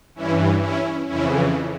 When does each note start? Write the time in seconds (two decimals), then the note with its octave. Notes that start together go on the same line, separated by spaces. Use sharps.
0.15 G2 E3 C#4 E4
0.62 C#4 E4
1.08 F2 C#3 E3 C#4 E4